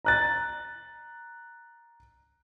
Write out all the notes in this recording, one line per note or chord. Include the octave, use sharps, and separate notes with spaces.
A#5 F#6 A6